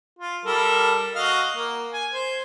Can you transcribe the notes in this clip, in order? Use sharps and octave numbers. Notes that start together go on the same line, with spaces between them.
F4
G3 A4 A#4
F#4 D#5 F5
A#3
G#5
C5